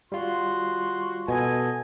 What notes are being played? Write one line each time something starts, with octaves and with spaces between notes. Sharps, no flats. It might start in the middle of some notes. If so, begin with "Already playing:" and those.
G3 F4 F#4 C6
B2 A4 D#5 G#5